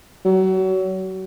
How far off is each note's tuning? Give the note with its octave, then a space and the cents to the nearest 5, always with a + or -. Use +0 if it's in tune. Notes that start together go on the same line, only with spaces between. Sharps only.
F#3 +30